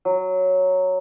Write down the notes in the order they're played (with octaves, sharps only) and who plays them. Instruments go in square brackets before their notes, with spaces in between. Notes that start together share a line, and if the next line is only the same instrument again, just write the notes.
[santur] F#3